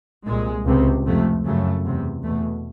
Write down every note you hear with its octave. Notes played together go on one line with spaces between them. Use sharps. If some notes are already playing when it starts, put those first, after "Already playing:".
C2 A#2 G#3
C#2 C3
F2 C3 A3
F#2 C#3 A3
E2 C3
E2 B2 A3